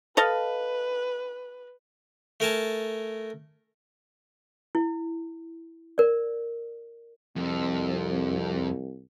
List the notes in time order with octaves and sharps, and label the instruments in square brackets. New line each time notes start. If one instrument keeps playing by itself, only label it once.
[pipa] A4 D#5 F5 [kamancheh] B4
[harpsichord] A3 A#4 G#5 A5
[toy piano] E4
A#4 D5
[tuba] C2 [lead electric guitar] F2